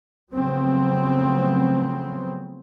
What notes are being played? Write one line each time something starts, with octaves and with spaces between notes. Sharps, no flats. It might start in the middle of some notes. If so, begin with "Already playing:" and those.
C#3 F3 F#3 A3 B3 C4